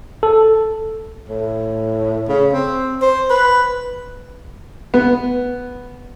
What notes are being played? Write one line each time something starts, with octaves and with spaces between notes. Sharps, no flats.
A4
A2
C#3
C4
C5
B4
B3